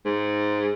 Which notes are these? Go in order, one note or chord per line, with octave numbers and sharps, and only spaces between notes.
G#2